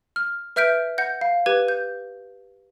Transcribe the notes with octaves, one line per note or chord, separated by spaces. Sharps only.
F6
B4 E5 F6 G6 B6 D7
F#5 G6 A#6
F5
G4 B4 G#6 D#7
G6